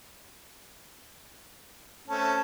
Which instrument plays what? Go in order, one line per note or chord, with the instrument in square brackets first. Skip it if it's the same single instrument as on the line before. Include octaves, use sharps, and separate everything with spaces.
[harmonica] A3 C4 C#4 [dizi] A5